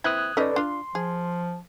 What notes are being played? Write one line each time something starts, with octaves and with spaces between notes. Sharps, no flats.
E3 C4 E4 D#6 F#6 G#6
C#4 D#4 A4 B4 D5 D#5
D4 F4 C6
F3 G#4